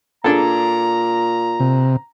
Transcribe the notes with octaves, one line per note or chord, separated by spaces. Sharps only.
A#2 D4 G#4 A4 A#5
C3